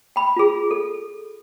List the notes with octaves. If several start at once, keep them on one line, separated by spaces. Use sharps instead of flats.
G5 B5
F4 G#4
A4